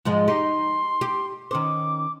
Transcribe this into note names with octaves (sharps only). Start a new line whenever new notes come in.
G#2 F3 G#3
D#4 G4 C6
G4
D#3 C#4 C5 D6